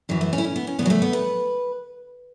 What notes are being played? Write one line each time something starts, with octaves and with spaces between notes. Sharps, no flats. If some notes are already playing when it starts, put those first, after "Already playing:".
F#2 E3 F#3
A3
C#4
E4
C#4
B3
C#4
E2 C#3 E3 B3
F#3
A3
B3
B4